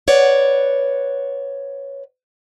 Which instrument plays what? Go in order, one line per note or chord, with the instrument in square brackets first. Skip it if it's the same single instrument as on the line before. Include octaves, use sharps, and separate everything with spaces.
[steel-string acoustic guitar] B4 C#5 D5 F#5